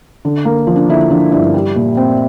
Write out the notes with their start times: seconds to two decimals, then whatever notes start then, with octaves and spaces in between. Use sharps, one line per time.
0.25 D3
0.45 A#3
0.67 F3
0.76 D4
0.89 D3 E4
1.10 F3 D4
1.32 G2 E4
1.54 G3
1.76 A#2
1.97 C4